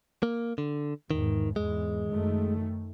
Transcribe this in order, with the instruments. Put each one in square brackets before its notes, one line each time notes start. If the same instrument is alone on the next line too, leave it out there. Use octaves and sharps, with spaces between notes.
[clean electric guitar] A#3
D3
[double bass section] E2 G#2 [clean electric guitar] D#3
[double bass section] E2 G#2 [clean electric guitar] G#3
[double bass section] F#2 D#3 A3